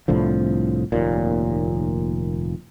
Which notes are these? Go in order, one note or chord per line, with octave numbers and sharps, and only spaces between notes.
C2 A2 D3 F3
F1 D#2 A#2